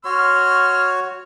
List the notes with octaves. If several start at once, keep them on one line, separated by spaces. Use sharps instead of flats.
F#4 C#5 C6 F6